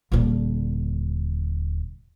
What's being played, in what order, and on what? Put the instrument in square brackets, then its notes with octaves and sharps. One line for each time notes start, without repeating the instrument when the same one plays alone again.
[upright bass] D#1 D3